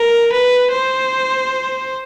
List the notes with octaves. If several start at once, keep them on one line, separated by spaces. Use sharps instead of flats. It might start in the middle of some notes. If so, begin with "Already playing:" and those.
Already playing: A#4
B4
C5